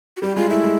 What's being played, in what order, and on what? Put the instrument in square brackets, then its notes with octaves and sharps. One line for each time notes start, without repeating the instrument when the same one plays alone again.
[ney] F#4
[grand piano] G3 [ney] G4
[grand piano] G#3 [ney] F4
[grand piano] A3 [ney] E4
[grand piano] G#3